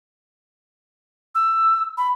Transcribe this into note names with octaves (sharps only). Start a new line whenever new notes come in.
E6
B5